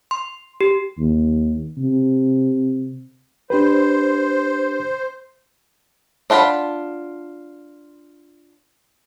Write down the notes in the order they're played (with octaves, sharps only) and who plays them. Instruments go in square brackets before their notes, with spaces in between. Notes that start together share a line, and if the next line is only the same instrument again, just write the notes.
[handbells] C6
G4
[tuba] D#2
C3
[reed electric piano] D4 G4 B4 [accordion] C5
[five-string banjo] D4 F4 F#5 A#5 B5